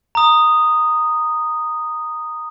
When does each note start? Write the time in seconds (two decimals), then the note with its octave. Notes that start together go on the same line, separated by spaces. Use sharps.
0.15 A#5 D#6